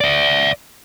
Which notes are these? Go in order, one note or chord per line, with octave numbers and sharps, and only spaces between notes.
D5 E5